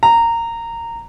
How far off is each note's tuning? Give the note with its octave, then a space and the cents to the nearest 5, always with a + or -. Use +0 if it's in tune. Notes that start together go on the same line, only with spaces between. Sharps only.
A#5 -15